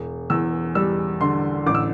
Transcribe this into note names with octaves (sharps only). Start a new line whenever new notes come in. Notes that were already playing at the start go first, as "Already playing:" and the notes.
Already playing: E1
E2 E6
G3 E6
D3 C6
A1 D6
E6